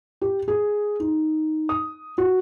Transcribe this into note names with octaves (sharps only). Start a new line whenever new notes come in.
G4
G#4
D#4
D#6
F#4